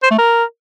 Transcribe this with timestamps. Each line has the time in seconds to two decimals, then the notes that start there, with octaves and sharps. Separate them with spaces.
0.03 C5
0.11 A3
0.18 A#4